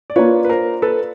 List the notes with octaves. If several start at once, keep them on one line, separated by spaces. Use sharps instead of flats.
D5
A#3 D4 F4 B4 C#5
B4
A#4 C5
A4 B4